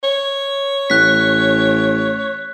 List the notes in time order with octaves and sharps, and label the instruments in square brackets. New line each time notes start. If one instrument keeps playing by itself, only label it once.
[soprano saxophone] C#5
[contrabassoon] A1 [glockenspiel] F#6 B6